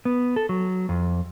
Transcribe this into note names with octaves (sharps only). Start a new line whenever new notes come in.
B3
A4
F#3
F2